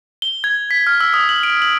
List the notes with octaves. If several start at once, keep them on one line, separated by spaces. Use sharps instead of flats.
G7
G#6
B6
F6
E6
D#6
F#7
D7
F#7